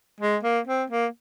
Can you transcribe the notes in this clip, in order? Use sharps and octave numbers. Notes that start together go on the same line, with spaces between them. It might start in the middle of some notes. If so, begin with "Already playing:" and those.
G#3
A#3
C4
A#3